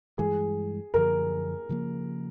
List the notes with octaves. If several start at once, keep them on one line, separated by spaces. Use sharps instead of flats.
G2 E3 G#3 G#4
F#2 D3 F3 A#4
C#3 F3 A#3